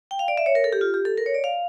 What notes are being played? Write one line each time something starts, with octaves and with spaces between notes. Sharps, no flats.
G5
F5
D5
E5
C#5
A#4
A4
G4
F4
G4
A4
A#4
C#5
D5
F5